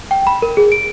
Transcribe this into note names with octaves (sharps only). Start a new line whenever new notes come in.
G5
B5
A#4
G#4
D7